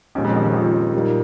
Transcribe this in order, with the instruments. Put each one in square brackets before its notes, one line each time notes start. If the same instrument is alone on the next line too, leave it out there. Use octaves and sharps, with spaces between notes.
[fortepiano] D#2 D#3 [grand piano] C#4
[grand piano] A#2 G#3
[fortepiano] F2 F3
D#2 D#3
F2 F3
D#2 D#3
[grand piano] A#2 G3 A#3 D#4